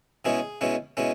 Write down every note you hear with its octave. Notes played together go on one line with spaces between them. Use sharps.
B2 G#3 C#4 E4 G#4
B2 G#3 C#4 E4
B2 G#3 C#4 E4